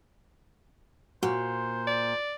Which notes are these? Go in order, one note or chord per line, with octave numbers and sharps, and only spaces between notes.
A#2 F#4 C5
D5